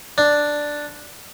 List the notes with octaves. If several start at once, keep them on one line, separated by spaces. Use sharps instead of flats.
D4